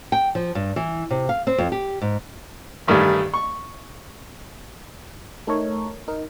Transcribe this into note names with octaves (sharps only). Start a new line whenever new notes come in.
G5
F3
G2
E3
C3
F5
C4
F2
G4
G#2
A1 G2 D#3 G3 A3
C#6
A3 D#4 A4 A#4 C#5
D#4 A#4